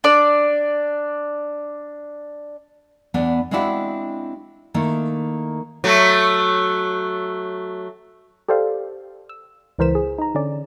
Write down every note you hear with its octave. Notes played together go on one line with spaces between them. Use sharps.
D4 D5
E2 B3 D4
G#3 C4 D4 E4 F#4 F5
D#3 A3 A#3 E4
F#3 A3
G4 A4 C5 D5 F5
E6
C#2 E3 A#4 C5 B6 E7
G#4
D#4 A#5
D3 C#4 D5